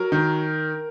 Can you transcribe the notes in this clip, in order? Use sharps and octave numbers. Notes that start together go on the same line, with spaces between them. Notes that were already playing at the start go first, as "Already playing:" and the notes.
Already playing: F#3 A#4
D#3